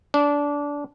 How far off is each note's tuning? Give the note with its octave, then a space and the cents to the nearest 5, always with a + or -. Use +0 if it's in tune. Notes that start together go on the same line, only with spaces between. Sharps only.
D4 -20